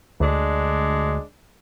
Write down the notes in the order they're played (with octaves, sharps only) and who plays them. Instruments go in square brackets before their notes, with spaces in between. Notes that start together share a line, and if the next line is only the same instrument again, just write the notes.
[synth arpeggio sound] D2 [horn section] G#3 D4